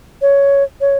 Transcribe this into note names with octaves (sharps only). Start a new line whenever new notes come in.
C#5
C#5